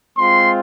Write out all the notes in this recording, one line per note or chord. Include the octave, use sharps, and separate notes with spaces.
G#3 C4 F4 C6